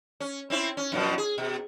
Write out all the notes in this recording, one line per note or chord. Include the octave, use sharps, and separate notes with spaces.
C#4
C4 C#4 E4
C#4
F#2 B2 F3
G#4
B2